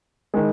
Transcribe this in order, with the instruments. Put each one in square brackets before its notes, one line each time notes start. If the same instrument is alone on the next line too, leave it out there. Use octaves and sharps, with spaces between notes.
[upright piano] D#3 G#3